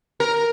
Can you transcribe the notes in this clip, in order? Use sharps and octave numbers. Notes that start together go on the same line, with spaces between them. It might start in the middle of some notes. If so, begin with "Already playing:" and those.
A#4